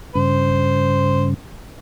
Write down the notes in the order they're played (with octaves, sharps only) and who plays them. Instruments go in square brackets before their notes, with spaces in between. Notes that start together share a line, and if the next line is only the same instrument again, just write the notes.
[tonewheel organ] G2 C#3 [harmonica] C5